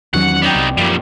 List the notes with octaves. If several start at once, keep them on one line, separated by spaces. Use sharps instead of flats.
E2 D#3 F#3 C#4 F#5
B3 D#4 D5 D#5 G5
C2
F#2 A#2 F3 G3 A#3